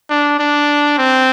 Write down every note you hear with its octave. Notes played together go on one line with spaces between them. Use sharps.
D4
D4
C4